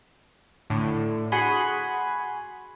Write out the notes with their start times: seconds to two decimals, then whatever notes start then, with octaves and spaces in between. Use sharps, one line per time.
0.70 A2 D3
1.32 F#4 G#4 F#5 G#5 B5 C6